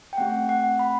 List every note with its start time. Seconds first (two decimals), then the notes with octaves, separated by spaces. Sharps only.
0.13 G5
0.17 A3 C4 G4 F#5
0.49 F#5
0.79 B5